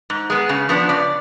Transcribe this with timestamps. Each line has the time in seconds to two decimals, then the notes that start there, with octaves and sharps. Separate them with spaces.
0.10 G#2
0.30 G#3 B3
0.49 C#3
0.69 F3 B3 D4
0.89 C#3 D5